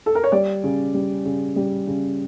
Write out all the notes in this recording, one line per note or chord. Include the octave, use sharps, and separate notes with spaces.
A4
A#4
C#5
G3 D5
C#3
G3
C#3
G3
C#3